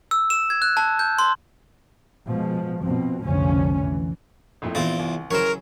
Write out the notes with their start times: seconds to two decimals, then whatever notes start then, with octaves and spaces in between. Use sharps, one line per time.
0.11 E6
0.30 E7
0.50 G#6
0.62 F#6
0.77 A5
0.99 G6
1.19 C6
2.26 B2 F3 G#3
2.82 B2 F3 C4
3.24 F1 B1 D3 F3 C#4
3.81 E3
4.62 A#1 F2 A2
4.75 A#1 E2 C4 F4
4.99 C2
5.31 C#3 E3 F#3 A#4 C5 C#5